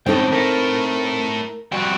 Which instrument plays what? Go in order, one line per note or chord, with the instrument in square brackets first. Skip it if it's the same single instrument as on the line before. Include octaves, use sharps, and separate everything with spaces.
[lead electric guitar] C#2 A2 [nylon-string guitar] C4 D#4 A4 [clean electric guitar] G5
[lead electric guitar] A3 E4 [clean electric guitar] A#4
[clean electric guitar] F2 G3 G5 [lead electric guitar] C4 F#4